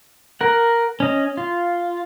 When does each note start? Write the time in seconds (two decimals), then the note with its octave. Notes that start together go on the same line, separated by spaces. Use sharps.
0.41 A#4 F#5
1.00 C#4 D#5
1.37 F4